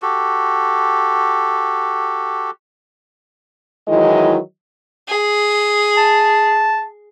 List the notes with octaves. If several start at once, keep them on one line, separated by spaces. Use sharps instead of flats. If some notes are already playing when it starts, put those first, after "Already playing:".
F#4 G4 A4
D#3 E3 F#3 G#3 E4 D#5
G#4
A5